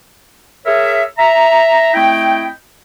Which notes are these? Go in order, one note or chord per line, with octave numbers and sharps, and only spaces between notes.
G#4 A#4 C#5 E5
E5 A#5
A3 C4 E4 D#5 G5